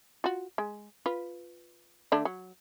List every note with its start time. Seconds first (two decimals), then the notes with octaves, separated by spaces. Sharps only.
0.24 F4 F#4
0.58 G#3
1.06 F4 B4
2.12 D3 A3 D4
2.25 F#3